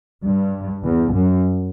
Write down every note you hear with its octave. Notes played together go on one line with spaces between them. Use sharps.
G2
E2
F#2